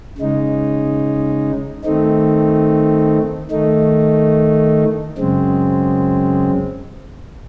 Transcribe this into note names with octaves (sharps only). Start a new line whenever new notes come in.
C#3 G#3 D#4
D#3 A3 C4 D#4
D#3 A3 D#4
F#2 C#3 G#3 C4